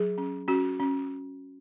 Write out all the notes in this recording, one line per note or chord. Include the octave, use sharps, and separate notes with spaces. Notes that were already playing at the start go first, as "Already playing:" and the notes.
Already playing: F#3 G#4
C#4
C#4 F#4
C#4